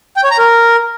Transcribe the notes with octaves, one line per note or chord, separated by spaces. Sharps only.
G5
C#5
A#5
A#4